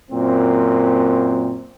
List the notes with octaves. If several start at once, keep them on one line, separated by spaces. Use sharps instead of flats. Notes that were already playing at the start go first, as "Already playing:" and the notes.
F#2 A#2 C4